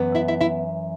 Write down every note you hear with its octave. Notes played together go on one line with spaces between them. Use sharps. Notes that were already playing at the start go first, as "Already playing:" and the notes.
Already playing: F#2 E3 B3
E4 E5
E4 E5
E4 E5